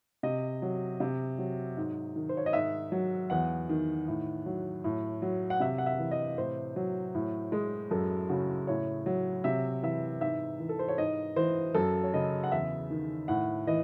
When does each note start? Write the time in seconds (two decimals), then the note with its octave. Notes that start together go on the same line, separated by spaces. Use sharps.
0.23 C3 D#5
0.62 F#3
1.00 C3
1.38 F#3
1.77 G#2
2.16 D#3
2.29 C5
2.37 C#5
2.46 D#5
2.53 G#2 E5
2.92 F#3
3.30 E2 F#5
3.69 D#3
4.08 A2
4.46 F#3
4.84 A2
5.22 F#3
5.50 F#5
5.60 C3 E5
5.78 F#5
5.86 E5
5.99 E3
6.11 D#5
6.38 A2 C5
6.76 F#3
7.15 A2
7.52 G#3
7.91 F#2 A4
8.29 C#3 F#4
8.67 A2 C#5
9.06 F#3
9.44 C3 E5
9.83 E3 E5
10.21 G#2 E5
10.60 E3
10.69 A4
10.79 C5
10.88 C#5
10.98 G#2 D#5
11.36 E3 C5
11.74 F#2 A4
12.03 C#5
12.14 C#3 D#5
12.44 F#5
12.51 E2 E5
12.90 D#3
13.28 A2 F#5
13.67 E3 D#5